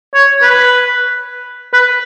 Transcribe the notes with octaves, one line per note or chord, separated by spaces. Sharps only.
C#5
B4
B4